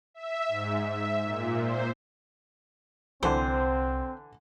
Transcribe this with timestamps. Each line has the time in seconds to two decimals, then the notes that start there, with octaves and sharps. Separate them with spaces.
0.14 E5
0.48 G#2
0.89 E5
1.24 A#2
1.62 C5
3.23 C2 D3 E3 C4 C5